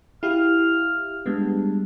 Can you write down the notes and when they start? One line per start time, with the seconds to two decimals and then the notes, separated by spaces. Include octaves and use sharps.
0.23 E4 G4 F5 F6
1.26 G3 G#3 B3 D4